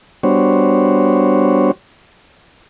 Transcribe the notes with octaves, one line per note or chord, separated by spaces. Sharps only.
G3 B3 D4 F#4 C5 C#5